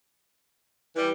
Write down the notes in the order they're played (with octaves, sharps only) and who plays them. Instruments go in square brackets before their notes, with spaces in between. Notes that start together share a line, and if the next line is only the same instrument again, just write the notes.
[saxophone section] E3 G3